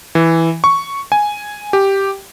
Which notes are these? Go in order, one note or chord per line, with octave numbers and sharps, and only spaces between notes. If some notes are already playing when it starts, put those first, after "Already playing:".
E3
C#6
G#5
G4